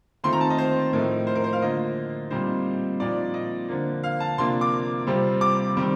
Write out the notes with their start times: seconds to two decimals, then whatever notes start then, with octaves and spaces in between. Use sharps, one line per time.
0.24 D#3 A3 C4 F4 C6
0.33 A#5
0.41 A5
0.50 D#5
0.58 C5
0.93 A2 F3 A3 D#4 A#4
1.27 C5
1.35 A#4
1.44 C5
1.53 F5
1.62 D3 F3 A#3 F4 D#5
2.31 A#2 G3 C4 D#4 C5
3.00 A#2 F3 C4 D#4 D5
3.34 D#5
3.69 D3 F3 A#3
4.04 F5
4.20 A5
4.38 C3 F3 A#3 D4 F4 C6
4.61 D6
5.07 C3 G3 C4 F4
5.41 D6
5.77 D#3 G3 C4